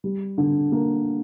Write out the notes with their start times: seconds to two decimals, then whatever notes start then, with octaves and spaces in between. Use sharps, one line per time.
0.04 G3
0.38 D3
0.72 A#3